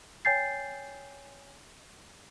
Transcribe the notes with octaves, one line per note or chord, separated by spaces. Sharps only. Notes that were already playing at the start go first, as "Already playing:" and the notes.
C#5 G5 G#5 G6 A6 C7